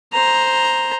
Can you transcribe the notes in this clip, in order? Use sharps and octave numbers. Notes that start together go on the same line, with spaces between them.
C5 A#5